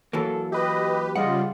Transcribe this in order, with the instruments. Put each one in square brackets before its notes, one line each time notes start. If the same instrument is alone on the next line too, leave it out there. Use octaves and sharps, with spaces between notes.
[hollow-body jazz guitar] E3 F#3 A#3 [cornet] A4
[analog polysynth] G4 B4 [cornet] D#5
[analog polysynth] C#3 G3 F4 [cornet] D#5 [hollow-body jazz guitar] F#5